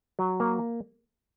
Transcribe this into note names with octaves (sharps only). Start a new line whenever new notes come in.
F#3
A#3